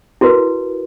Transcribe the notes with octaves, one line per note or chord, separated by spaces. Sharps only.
E4 F#4 A#4 B4